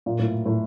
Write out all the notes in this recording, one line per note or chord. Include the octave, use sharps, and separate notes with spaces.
A#2
A2
A2